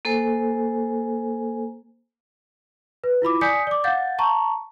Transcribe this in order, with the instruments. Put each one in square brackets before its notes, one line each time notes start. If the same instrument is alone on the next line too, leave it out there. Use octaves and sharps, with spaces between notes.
[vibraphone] A#3 A4 C5 G#5
[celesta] B4
E4 F4 B5 D6
D5 G#5 D#6 G6 B6 C#7
D5 D6
F5 F#5 G6 A6
A5 A#5 C#6